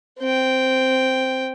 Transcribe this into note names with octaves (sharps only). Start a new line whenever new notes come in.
C4 G5